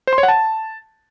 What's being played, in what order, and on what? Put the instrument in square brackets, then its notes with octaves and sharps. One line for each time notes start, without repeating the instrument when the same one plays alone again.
[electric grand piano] C5
C6
C#5
F#5
A5